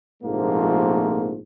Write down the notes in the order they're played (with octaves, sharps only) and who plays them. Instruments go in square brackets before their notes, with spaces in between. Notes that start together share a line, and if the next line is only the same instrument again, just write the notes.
[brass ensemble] A#1 G#2 C3 F3 A3 A#3